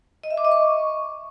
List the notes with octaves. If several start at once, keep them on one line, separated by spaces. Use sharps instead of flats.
D#5
E5
D6
D#5
C#6